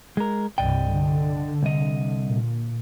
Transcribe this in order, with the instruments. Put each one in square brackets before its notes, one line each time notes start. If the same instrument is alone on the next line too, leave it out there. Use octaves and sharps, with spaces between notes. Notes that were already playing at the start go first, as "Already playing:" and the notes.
[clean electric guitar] G#3 A#4
[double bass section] C2 G2 C3 [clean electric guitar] D5 D#5 G5
[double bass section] D3
[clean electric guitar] C2 D#5
[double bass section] A#2